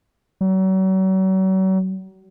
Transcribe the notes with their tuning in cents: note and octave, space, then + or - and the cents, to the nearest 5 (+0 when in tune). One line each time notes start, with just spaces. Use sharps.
F#3 +40